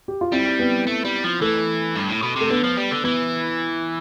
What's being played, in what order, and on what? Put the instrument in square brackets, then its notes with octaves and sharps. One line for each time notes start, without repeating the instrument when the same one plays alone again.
[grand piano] G4
F4
[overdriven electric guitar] G3 [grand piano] C4 E4
[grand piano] B3
[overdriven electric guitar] A3
G3
F3
[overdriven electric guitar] E3 [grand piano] A3
[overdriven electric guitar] G2
A2
B2
[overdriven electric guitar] C3 [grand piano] A3
[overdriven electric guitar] D3 [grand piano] B3
[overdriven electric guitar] F3
G3
D3
[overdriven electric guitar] E3 [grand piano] B3